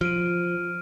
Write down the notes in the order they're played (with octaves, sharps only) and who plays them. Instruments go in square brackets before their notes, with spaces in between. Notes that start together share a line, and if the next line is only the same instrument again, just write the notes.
[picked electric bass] F3 [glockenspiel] F6 D7 D#7